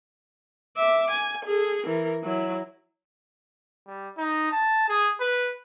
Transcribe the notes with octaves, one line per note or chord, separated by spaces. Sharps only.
E5 D6
G#5
G#4 A4
E3 A#4
F#3 E4
G3
D#4
A5
G#4
B4